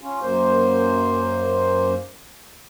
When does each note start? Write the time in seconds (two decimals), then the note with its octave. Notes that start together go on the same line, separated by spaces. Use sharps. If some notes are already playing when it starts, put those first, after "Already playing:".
0.02 C#4 F4
0.22 F#2 A#3 C5